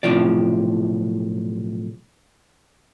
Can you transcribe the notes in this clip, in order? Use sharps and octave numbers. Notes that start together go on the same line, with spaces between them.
B1 A2 C3 F3 D5